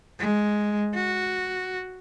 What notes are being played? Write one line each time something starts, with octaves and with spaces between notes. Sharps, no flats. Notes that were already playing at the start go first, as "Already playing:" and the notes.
G#3
F#4